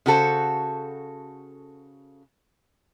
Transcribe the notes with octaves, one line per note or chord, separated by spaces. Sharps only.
C#3 F#4 A4 C5